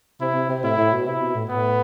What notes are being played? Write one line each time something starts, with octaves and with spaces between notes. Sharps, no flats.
C3 E4
C3
C3
A2 E4
A2
B2
C3 E4
B2
A2
A2 B3